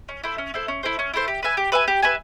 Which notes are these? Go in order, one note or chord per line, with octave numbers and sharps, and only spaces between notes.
C#4
E4 A4 C5
C#4
E4 A4 C5
C#4
E4 A4 C5
C#4
E4 A4 C5
G4
B4 E5 G#5
G4
B4 E5 G#5
G4
B4 E5 G#5